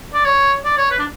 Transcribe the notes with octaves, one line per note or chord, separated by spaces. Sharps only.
D5
C#5
D5
C#5
B4
D4